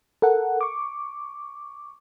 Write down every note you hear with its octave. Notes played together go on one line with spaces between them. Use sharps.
A4 A#4 F#5
C#6 D6